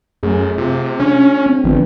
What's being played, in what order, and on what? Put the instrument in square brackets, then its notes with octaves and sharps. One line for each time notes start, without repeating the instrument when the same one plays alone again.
[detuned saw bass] F#2 [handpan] A3 G#4
[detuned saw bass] C3 [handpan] F4
[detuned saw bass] C#4 [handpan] D4
[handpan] C4
[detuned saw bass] G#1 [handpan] D3 F3 B3